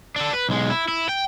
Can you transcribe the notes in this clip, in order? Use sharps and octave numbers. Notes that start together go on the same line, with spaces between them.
D4 A4
B4
B1 G#3
E4
E4
G5